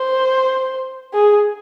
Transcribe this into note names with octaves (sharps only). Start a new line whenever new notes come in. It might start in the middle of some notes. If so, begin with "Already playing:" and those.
Already playing: C5
G#4